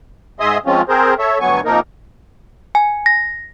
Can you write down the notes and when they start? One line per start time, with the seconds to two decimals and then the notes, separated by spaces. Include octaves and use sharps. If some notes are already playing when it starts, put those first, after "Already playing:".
0.40 G#2 G#4 D#5 E5 C6 D#6
0.66 F3 G#3 C4 C#4 F4
0.89 C4 G#4 A#4 C5
1.19 A4 C#5 E5
1.40 D2 G2 F#3 B3 G#5 C#6
1.65 C3 F3 A#3 D#4 A#4
2.75 G#5
3.06 A#6